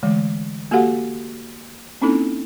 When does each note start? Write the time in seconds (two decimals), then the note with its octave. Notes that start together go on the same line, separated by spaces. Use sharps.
0.03 D3 E3 G#3 A3
0.71 A#3 F#4 G4 A4 F5 F#5
2.01 A#3 C4 C#4 D#4 E4 A4